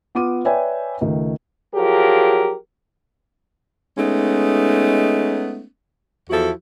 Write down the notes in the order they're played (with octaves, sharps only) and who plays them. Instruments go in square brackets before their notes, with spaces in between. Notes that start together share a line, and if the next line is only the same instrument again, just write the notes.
[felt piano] B3 F4 D6 D#7
B4 C#5 D5 E5 G5 G#5
C#2 D#3 A3
[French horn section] F3 F#3 G4 G#4 A#4
[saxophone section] G#3 A3 B3 C#4 D#4
E2 F3 E4 F#4 A4